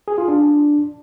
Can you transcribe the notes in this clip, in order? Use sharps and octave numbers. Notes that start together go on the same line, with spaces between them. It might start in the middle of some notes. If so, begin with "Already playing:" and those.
G#4
F4
D4